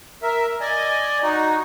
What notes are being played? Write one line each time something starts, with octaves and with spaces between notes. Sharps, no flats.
A#4 E5
D5 D#5 G#5
D#4 F#4